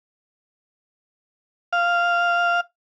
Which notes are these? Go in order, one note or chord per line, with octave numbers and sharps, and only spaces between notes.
F5